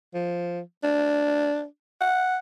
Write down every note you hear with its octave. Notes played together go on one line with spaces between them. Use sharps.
F3
D4
F#5